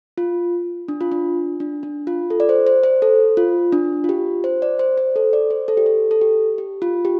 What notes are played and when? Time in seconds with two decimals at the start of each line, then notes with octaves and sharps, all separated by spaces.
0.18 F4
0.88 D4
1.01 F4
1.12 D4
1.60 D4
1.83 D4
2.07 F4
2.30 A4
2.40 D5
2.49 C5
2.67 C5
2.84 C5
3.02 A4
3.37 F4
3.72 D4
4.04 F4
4.09 G4
4.44 C5
4.62 D5
4.79 C5
4.97 C5
5.16 A4
5.33 D5
5.50 C5
5.68 A4
5.77 G4
5.86 A4
6.11 A4
6.21 G4
6.58 G4
6.82 F4
7.05 G4